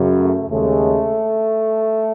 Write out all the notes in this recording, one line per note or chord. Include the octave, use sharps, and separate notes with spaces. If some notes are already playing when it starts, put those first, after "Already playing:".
Already playing: F#2 C#3 F#3
A3
D#2 C#3 G#3 A3